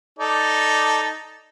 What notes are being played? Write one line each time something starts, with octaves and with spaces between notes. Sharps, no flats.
D#4 A4 D5